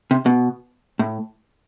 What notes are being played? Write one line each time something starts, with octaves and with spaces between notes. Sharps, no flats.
C3
B2
A2